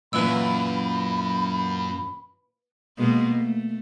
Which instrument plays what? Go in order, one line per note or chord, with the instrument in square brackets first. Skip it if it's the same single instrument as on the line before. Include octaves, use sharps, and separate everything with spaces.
[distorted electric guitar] F#2 [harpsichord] A#2 E3 [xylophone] B4 E6 [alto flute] B5
[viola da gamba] B2 G#3 A#3
A3